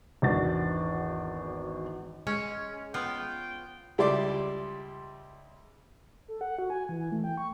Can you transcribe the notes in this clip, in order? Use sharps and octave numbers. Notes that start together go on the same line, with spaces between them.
G#1 E2 D4 F#4 A6
G#3 C#4
B3 F4 G5
C#2 G3 E4 D5 C6 D6
A4
F#5
F#4
G#5
E3
A3
G5
C#6